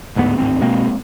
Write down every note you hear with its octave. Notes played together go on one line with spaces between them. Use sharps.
D1 D2 G#2 B3
D1 G#1 C4
B2 G#3 A#3 C4